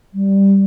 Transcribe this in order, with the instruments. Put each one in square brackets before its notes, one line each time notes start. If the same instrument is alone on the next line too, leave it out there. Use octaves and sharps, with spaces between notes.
[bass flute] G3